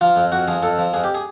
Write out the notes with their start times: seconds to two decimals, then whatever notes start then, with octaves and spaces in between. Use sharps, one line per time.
0.01 F3 F4
0.16 F2
0.32 F2 F#4
0.48 F3 G#4
0.62 F2 A4
0.78 F3
0.94 F2 G#4
1.04 G4
1.15 G#4